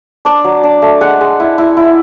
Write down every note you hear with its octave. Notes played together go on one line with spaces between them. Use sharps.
D4 D5
F#3
D4
A3
G#3 F#5
G#3
E4
E4
E4